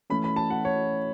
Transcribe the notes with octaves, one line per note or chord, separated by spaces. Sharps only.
E3 A3 C#4 B5
B5
A5
F#5
C#5